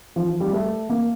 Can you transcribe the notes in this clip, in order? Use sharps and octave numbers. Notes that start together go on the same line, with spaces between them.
F3
F3
G3
A3
A#3